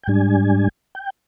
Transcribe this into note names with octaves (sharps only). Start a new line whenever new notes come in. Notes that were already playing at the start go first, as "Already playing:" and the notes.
G5
G#2 G3 D4 G#5
G5